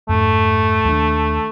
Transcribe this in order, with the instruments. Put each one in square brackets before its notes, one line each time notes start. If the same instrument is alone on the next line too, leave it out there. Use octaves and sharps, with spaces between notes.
[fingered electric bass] F2 G#2 [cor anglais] A3
[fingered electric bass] D#2 G3 D4